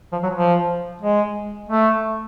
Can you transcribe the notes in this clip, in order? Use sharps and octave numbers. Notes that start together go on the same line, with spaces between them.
F3
F#3
F3
G#3
A3